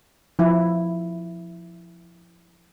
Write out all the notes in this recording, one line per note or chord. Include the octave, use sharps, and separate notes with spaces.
F3 E4